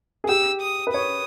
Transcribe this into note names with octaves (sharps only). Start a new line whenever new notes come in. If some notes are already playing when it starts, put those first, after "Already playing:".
G#4
G4 E6
D#6
B4
C#5 D#6